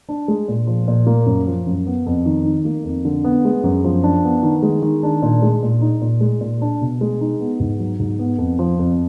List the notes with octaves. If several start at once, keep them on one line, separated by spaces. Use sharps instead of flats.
D4
G#3
A#2
F3
A#2
A#3
F#2
F3
F#2
B3
F2
D#3
D#4
A#3
F2
D3
B3
G#3
F#2
F3
D4
B3
D#3
G#3
D#3
D4
A#2
G#3
A#2
D#4
A#2
G#3
A#2
D4
B2
G#3
D#4
B3
G#2
F#3
G#2
B3
F2
F3
F2